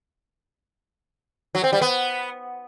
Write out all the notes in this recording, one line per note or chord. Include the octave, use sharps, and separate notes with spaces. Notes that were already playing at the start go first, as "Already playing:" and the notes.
F#3
C4
G3
B3